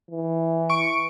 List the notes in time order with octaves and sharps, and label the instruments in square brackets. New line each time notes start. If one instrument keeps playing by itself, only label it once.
[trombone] E3
[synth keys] C#6 D7